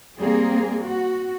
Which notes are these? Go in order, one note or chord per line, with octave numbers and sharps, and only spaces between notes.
G3 A#3 C4 G#4
F#4